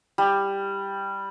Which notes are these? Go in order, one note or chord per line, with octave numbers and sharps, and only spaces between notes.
G3